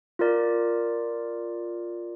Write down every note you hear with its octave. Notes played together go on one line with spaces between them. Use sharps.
F4 A#4 D5